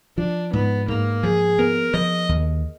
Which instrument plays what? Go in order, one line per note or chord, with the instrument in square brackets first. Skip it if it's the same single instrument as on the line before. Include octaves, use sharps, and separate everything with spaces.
[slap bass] F3 [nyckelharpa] D4
[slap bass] G#2 [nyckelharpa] B3
[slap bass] G#2 [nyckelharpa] A#3
[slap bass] F3 [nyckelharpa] G#4
[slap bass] B3 [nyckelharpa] A#4
[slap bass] F3 [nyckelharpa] D#5
[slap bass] D#2